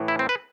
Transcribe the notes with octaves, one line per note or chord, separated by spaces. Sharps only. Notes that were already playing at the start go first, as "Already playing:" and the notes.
Already playing: A2 E3
E4
C4
B4